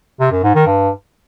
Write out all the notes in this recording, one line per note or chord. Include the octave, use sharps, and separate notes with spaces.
C3
F#2
G#2
D#3
G2